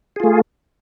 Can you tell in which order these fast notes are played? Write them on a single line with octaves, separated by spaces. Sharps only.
G#4 F4 A3